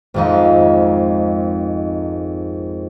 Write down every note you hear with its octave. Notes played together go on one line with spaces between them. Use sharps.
G#1 F2 D#4